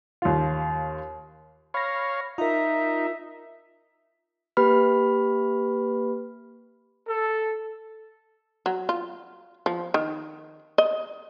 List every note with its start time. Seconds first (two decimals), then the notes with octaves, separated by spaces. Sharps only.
0.22 D#2 F4
1.74 C#5 F5 B5 A#6
2.38 D#4 F4 A#4 E5
4.57 A#3 G4 B4 B5 F6
7.07 A4
8.66 F#3
8.89 F4
9.66 F3
9.94 D#3
10.78 D#5